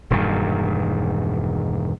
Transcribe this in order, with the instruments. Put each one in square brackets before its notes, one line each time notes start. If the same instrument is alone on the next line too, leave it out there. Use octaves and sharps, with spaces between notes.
[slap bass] E1 G2 A#2 D#3